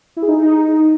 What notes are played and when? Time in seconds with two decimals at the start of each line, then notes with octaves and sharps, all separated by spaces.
0.17 E4
0.22 G#4
0.28 D#4